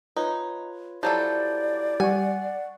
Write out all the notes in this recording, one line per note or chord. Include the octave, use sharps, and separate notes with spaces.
D#4 F4 B4 C#5
F3 F#3 E4 G4 A4 D5 G6
G3 F#5 G#5 C#6